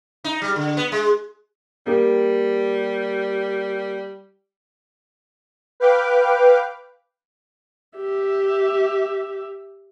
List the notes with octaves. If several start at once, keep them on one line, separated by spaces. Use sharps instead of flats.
D#4
G3
D3
B3
G#3
G3 A#3 G4
B4 F5 G5 D6
G4 E5